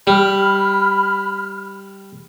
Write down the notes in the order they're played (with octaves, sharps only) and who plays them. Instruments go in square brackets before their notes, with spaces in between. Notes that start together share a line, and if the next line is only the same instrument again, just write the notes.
[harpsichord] G3 [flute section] B5 F6